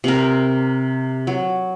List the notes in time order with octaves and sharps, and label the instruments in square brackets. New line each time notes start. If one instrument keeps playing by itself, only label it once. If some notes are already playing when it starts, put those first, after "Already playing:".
[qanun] C3 A#4
F#3